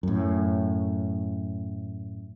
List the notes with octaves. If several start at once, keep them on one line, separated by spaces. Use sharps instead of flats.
F#2 A2